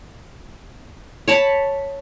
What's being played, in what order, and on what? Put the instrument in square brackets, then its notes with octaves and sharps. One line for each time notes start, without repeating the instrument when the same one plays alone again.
[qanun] C#5 A5 B5